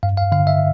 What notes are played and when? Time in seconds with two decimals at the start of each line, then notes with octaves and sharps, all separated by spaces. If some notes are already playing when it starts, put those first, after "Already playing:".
0.03 G2 F5
0.17 F5
0.32 D3 F5
0.47 E5